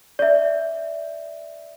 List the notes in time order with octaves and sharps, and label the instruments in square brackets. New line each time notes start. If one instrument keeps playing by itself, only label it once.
[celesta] D5 E5